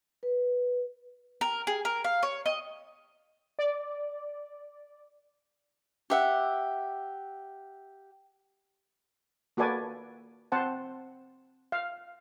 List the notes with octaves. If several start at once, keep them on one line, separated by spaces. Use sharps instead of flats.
B4
A#4
G#4
A#4
F5
C#5
D#5
D5
G4 E5 F#5
A#3 F#4 A4 B4 D5 G#5
C4 C5 F#5 A5
F5